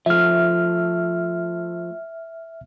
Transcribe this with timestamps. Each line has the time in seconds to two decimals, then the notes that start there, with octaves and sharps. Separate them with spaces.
0.06 F3 A3 E5 F6